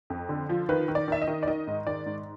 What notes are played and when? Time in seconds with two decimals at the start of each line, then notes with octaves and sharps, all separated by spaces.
0.10 F2
0.29 D3
0.49 F3
0.69 D#3 B4
0.88 D#3
0.95 D5
1.08 D#3 E5
1.22 D#5
1.28 D#3
1.43 D5
1.47 D#3 D#5
1.67 G#2
1.87 D#3 D5
2.06 G#2